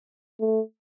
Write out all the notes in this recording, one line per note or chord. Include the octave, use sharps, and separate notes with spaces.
A3